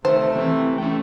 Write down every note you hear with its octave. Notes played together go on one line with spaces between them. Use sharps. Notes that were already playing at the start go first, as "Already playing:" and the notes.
C3 D#3 A3 C5
E3 C4
A3 C#4 G5